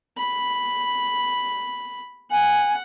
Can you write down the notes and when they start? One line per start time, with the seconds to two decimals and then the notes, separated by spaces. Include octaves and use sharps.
0.18 B5
2.31 F#5 G#5